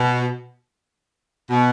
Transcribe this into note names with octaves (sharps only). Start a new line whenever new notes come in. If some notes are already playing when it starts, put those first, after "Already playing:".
Already playing: B2
B2